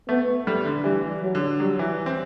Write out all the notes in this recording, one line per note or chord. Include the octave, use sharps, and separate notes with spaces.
A3 B3
G3 A3
D3
E3 G3
F#3
D3
F#3 G3
E3
C4